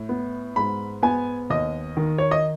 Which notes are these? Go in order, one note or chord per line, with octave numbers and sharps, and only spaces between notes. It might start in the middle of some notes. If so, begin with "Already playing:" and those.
Already playing: A2
B3
G#2 B5
B3 G#5
D#2 D#5
D#3
C#5
D#5